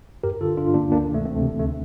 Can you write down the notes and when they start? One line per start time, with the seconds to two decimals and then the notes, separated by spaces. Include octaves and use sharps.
0.23 G2 G4 A#4
0.41 D3 F4 A4
0.57 G2 D4 F4
0.74 D3 A#3 D4
0.92 D2 A#3 D4
1.08 C3 E3
1.14 A3
1.25 D2 A3 C4
1.42 C3 E3
1.59 D2 A3